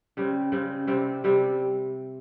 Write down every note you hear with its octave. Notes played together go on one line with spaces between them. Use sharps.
C#3 G3 C4
C#3 G3 C4
C3 G3 C4
C3 G3 C4